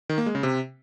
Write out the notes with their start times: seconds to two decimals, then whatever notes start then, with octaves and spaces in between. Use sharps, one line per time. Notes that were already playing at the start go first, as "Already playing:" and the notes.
0.09 D#3
0.18 A#3
0.26 G#3
0.35 C#3
0.43 C3